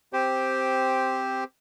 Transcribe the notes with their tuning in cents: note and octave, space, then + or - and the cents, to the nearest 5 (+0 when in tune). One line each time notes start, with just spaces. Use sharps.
C4 +0 G4 +0 C5 +0